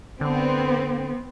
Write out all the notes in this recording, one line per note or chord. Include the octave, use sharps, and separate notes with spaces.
D3 B3 C4